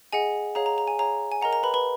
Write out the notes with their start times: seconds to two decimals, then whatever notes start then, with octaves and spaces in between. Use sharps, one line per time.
0.13 G#4 D#5 F#5 G#5
0.55 G#4 C#5 F5 A#5
0.66 A#5
0.78 A#5
0.88 G#5
0.99 G#4 C#5 F5 A#5
1.32 G#5
1.42 A#4 D#5 F#5 A#5
1.53 A#5
1.63 B4 B5
1.74 B4 B5